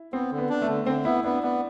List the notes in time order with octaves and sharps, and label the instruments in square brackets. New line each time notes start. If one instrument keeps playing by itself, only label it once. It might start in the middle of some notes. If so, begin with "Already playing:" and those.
Already playing: [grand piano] E4
[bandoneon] B3 [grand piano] C4
[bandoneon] D3
[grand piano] B3
[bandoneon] D4
[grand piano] A3
[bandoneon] D3
[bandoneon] D3 [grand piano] C4
[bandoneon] B3 [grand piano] E4
[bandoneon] B3 [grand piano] D4
[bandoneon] B3 [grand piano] D4